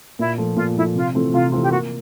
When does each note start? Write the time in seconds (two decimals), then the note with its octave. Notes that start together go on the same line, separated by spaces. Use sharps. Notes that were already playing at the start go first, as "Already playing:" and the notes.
0.19 A#2 E4
0.38 F3 A3
0.57 A#2 F4
0.76 F3 A3 E4
0.95 C3 F4
1.15 E3 A3 C4 F4
1.33 C3 F4
1.52 E3 A3 C4 F4
1.62 G4
1.71 A#3 F#4